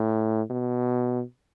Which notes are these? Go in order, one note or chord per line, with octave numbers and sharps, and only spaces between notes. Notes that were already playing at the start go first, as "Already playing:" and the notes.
Already playing: A2
B2